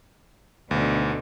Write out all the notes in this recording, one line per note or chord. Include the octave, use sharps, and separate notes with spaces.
D2 B2 D3 D#4